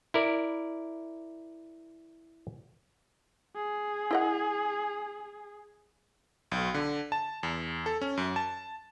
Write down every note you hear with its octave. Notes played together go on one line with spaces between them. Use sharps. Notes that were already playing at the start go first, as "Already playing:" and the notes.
E4 A#4 D5
G#4
E4 D#5 F#5
B1
D3
A5
E2
A4
C#4
F#2
A5